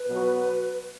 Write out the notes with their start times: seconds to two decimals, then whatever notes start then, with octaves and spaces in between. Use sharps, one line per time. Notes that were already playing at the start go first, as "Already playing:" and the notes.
Already playing: B4
0.08 B2 F#3 B3 F#4